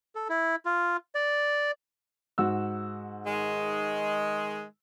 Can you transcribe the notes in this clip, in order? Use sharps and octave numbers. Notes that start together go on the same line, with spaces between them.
A4
E4
F4
D5
G#2 F#4 E6
D#3 G#3